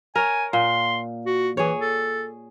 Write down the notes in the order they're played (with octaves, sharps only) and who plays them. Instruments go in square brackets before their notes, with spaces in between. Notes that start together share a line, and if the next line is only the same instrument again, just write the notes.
[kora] A#4 C#5 [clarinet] G#5
[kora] A#2 [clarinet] C6
[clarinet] F#4
[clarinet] E3 [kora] G#4 C#5
[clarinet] A4